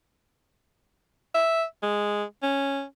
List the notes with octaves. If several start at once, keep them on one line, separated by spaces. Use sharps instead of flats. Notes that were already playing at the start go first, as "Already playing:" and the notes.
E5
G#3
C#4